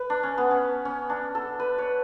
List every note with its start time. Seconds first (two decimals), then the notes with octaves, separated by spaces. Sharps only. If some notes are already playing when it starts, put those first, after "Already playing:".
Already playing: B4
0.10 D4
0.23 C#4
0.38 B3
0.51 C#4
0.85 C#4
1.10 D4
1.35 A4
1.60 B4
1.78 C#5